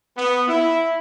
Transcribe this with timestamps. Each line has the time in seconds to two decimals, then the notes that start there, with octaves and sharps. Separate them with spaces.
0.17 B3
0.48 E4